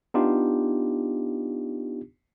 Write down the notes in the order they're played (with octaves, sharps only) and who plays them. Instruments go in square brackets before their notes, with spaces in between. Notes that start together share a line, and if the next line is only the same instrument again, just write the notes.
[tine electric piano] B3 D4 D#4 F4 G4